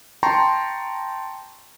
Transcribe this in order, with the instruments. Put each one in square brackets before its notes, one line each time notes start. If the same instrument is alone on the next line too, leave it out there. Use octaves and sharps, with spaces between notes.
[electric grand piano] G5 A5 A#5 C6 C#6